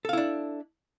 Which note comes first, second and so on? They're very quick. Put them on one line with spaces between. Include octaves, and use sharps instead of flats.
A4 F5 E4 D4